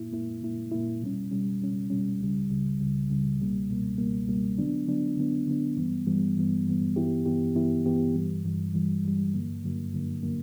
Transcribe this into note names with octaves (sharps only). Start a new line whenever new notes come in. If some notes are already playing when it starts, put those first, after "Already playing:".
Already playing: A#2 A#3 E4
A#2 A#3 E4
A#2 A#3 E4
A#2 A#3 E4
B2 G3 C#4
B2 G3 C#4
B2 G3 C#4
B2 G3 C#4
C#2 C#3 G3
C#2 C#3 G3
C#2 C#3 G3
C#2 C#3 G3
C#2 B2 G3 A#3
C#2 B2 G3 A#3
C#2 B2 G3 A#3
C#2 B2 G3 A#3
D3 F#3 B3 D4
D3 F#3 B3 D4
D3 F#3 B3 D4
D3 F#3 B3 D4
G2 E3 G3 B3
G2 E3 G3 B3
G2 E3 G3 B3
G2 E3 G3 B3
G2 E3 B3 E4 G4
G2 E3 B3 E4 G4
G2 E3 B3 E4 G4
G2 E3 B3 E4 G4
G2 E3 G3
G2 E3 G3
G2 E3 G3
G2 E3 G3
G2 D3 F#3 A#3
G2 D3 F#3 A#3
G2 D3 F#3 A#3
D3 F#3 A#3